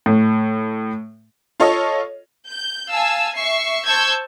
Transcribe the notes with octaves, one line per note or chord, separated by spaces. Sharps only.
A2
F4 A4 C#5 D#5
G6
F5 G#5 A5 E6
E5 C#6 C7
C5 A5 C#6 E6 G6 G#6